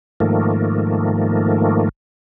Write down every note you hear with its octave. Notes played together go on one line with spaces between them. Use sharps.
G#2 D#3 F3 A3 A#3